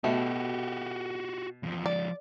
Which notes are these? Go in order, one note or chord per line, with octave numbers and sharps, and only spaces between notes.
B2 A3 F#4 G4
E2 F3
F3 G#3 D5